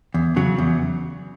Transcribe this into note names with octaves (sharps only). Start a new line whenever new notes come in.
E2
C#3 F#3
E2